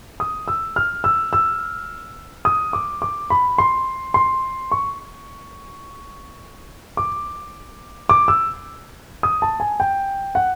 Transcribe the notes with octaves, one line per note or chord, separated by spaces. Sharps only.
D#6
E6
F6
E6
E6
D#6
D6
D6
B5
C6
C6
C#6
D6
D6
E6
D#6
A5
G#5
G5
F#5